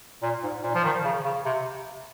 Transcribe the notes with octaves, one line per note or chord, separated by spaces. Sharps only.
A#2
G#2
A#2
F3
D#3
C#3
C#3
C3